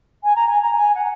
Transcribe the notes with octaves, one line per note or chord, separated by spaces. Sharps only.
G#5
A#5
G#5
A#5
G#5
F#5